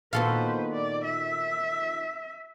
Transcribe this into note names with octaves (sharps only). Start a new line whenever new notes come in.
A#2 D#3 B3 F#4 A4 B4 C5 F5
D5
E5